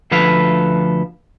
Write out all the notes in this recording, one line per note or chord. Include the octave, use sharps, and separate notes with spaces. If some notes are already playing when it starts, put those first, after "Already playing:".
D2 F3 A4 B4 F5